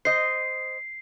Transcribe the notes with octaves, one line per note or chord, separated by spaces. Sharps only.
C5 D#5 C7